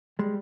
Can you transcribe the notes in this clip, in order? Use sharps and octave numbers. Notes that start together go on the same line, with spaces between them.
G3 G#3